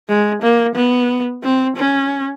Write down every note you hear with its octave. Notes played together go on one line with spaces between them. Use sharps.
G#3
A#3
B3
C4
C#4